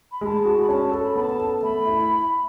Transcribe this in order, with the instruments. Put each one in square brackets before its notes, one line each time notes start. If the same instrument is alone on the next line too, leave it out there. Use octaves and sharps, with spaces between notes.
[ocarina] B5
[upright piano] G#3 [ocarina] B5
[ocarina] A5
[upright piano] F#4
[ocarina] B5
[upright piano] C#4 [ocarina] A5
[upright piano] A4
[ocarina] B5
[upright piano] B3 [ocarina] B5
[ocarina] A5
[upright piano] A4
[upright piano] A3 [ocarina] B5
[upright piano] E4